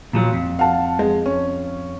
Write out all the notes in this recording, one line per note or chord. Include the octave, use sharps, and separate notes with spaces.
A#2 F3 F#3
F2
F5 F#5 A5
G#3
C#4